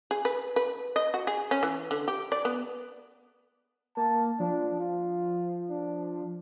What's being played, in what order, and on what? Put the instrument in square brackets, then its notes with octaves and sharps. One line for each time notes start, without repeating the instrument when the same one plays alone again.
[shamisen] G#4
B4
B4
D#5
F#4
G#4
C#4
E3
D3
G4
D5
B3
[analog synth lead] A#3 [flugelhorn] A5
[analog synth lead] F3 [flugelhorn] D4
[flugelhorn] F4
D4